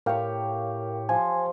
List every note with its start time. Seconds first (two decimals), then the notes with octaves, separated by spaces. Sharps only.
0.06 A2 G4 A#4 C#5 F5 G5
1.09 F3 G#5